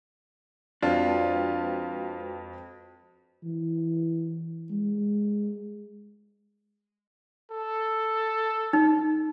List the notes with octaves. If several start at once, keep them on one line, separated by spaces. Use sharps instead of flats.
F2 G#3 D4 F4 F#4 B4
E3
G#3
A4
D#4